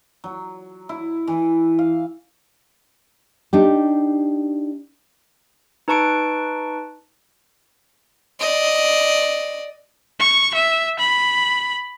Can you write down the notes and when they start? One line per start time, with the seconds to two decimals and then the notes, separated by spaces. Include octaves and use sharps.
0.24 F#3
0.89 E4
1.27 E3
1.79 F5
3.53 D4 D#4 G4
5.88 D#4 B4 A5 C#6 C#7 D7
8.40 D5 D#5
10.19 C#6
10.54 E5
10.99 B5